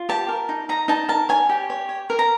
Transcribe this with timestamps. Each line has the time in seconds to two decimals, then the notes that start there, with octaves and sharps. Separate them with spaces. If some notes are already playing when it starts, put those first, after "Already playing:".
Already playing: F4
0.09 G4 A5
0.29 A#4
0.49 D#4
0.69 D#4 A#5
0.88 D#4 A5
1.09 A#4 A5
1.29 C#5 G#5
1.49 G4
1.70 C#5
1.89 C#5
2.10 A#4
2.19 A#5